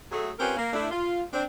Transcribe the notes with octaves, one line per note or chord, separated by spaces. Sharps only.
F#3 A3 G#4
C4 C#4 F4 G4 A#4 B4
A#3
A3 D4 E4
F4
C4 D4